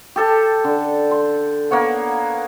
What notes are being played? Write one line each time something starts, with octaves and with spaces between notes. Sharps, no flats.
G4 A4 A5
D3
C6
A#3 B3 C#5 F#5